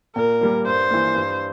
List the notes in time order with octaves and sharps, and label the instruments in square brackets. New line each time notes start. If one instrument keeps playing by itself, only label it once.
[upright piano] A#2 [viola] A#4
[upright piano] G3 A#3
[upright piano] G2 [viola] C5
[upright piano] E3 A#3
G2